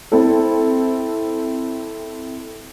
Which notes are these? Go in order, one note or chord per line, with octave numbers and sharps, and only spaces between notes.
C4 E4 A4